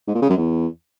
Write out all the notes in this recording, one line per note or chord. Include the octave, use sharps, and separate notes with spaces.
G#2
A#2
C#3
F#2
E2